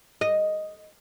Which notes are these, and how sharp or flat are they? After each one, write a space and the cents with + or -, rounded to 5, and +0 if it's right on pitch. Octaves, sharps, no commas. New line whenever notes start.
D#5 +0